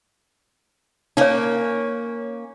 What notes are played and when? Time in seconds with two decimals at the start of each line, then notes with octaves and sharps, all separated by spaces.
1.17 A#3 C#4 D#4 C#5